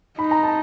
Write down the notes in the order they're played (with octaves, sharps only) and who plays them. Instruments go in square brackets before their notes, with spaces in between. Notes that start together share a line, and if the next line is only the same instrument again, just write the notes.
[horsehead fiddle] D#4 [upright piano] B5
[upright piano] A#5
A5